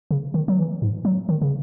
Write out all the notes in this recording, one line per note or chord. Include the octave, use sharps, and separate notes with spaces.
C#3
D#3
F#3
E3
G#2
F#3
D#3
C#3